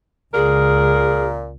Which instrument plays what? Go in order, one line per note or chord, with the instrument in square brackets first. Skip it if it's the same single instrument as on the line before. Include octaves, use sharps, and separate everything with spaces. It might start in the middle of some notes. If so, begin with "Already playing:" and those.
[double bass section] C#2 [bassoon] A#2 [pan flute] G#4 [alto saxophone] A#4